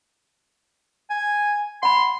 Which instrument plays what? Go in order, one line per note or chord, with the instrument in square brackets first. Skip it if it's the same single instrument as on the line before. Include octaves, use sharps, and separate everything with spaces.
[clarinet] G#5
[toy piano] F#5 B5 [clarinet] C6